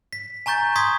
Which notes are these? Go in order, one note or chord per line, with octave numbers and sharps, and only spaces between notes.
B6
G#5 A#5 C#6 G6 A6
C6 C#6 D#6 G#6 B6